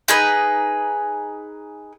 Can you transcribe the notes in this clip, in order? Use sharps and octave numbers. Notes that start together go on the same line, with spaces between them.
D#4 G#4 B4